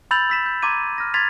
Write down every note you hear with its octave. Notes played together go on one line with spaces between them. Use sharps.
B5 E6 G6 A6 F7 F#7
E6 B6 E7
G6
A#5 C6 D6 G#6 D#7
F6 A#6
C6 G#6 A6 B6 F7